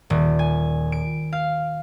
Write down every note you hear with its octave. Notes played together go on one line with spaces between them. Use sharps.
D#1
G#5
D7
F5